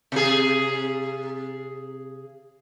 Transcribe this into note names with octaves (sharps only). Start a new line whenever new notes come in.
C3 G#4